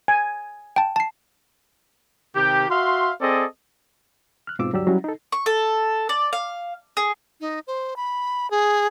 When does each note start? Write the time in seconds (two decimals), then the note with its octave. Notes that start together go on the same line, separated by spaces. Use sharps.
0.08 G#5
0.76 G5 A5
0.96 A5 C7
2.35 C3 D#3 G4
2.69 F#4 E5 F5 C6
3.21 C4 G#4 A4 D5 D#5
4.47 F6 F#6
4.59 G#2 B2 C4 F4 D6 E6
4.73 D2 G2 F#3 G4 D5 E6
4.87 F#3 G3 C#4 E4
5.04 D#4 A4
5.32 C#6
5.46 A4
6.09 D5
6.33 F5
6.97 G#4
7.41 D#4
7.67 C5
7.96 B5
8.51 G#4